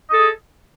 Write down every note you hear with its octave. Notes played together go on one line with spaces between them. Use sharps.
G#4 A4 D#5